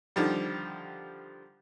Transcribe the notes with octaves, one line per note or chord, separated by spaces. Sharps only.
D3 D#3 F3 G3